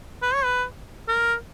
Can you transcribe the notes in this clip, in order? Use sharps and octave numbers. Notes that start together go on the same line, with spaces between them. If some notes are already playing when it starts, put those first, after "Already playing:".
B4
C#5
B4
A#4